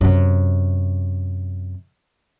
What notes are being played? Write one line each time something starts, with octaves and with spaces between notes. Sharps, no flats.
F#2 C3